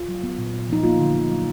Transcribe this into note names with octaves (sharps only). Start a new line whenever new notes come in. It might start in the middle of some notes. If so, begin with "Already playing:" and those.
Already playing: F4
F#3
B3
A#2
A#2
F3 D#4
A#3 F4
D3
D3
F#3